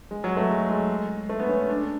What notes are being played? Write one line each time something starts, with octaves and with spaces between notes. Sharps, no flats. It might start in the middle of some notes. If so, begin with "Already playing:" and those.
G#3
F#3
A3
G#3
G#3
A3
B3
C#4
D4